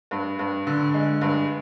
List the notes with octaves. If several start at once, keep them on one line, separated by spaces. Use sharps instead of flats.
G2
G2
D3
G#3
G2